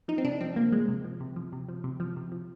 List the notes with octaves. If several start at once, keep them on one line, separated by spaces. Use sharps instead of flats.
F3 D#4
C4
C3 D4
F3 C4
C3 A#3
F3 G#3
C3
F3
C3
F3
C3
F3
C3
F3
C3
F3